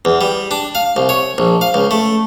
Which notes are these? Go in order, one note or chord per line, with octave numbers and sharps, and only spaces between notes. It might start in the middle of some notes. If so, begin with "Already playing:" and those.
E2
G3
D4
F5
C2
C#5
A#1
F5
C#2
A3